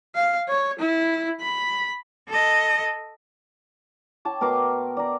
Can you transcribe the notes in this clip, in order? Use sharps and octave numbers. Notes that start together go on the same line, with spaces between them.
F5
C#5
E4
B5
A4 D#5
C#5 G5 A5 D6
B2 A#4 C6 D6
D5 A#5